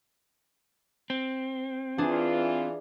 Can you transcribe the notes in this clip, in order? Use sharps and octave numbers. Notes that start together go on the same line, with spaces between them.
C4
E3 D4 F4 G#4